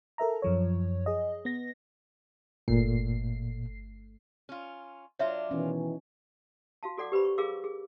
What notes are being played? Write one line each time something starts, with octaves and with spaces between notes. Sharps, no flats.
A4 A#4 E5 A#5
F#2 F3 C#5
G#4 D#5
B3 A#6
G1 A#2 A3 C7
C#4 F4
F#3 D4 F4 C#5 E5
B2 D#3 E3 C#4
F#4 F5 A5
F#4 A4 D5 F#5 D6
G4 B4 C5 B5
C#6
G#4 A#4 F5 D6 E6
G#4